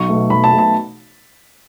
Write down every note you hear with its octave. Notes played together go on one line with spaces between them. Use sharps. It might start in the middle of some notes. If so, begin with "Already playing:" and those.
Already playing: B1 C#6
B2 A3
B1 B5
A5
B2 A3
A5